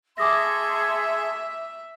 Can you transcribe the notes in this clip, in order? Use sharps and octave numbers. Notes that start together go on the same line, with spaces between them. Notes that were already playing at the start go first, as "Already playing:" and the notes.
G#4 A4 E5 C6 D6 D#6 A#6